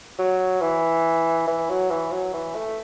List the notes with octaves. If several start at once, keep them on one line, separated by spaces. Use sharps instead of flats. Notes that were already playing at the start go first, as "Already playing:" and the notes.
F#3
E3
E3
F#3
E3
F#3
E3
A3